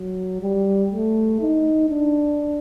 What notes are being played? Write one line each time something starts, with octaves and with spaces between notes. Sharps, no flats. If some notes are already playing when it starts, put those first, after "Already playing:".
Already playing: F#3
G3
A3
D#4
D4